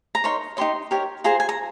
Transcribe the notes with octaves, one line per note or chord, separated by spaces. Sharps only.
A#5
D#4 A#4 C#5 C6
D#4 G4 C#5 C6
G4 A#4 C#5
F4 G#4 C5 A#5
G#5
A#5